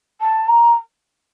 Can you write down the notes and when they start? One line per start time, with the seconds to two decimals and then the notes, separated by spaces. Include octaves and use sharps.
0.21 A5
0.48 A#5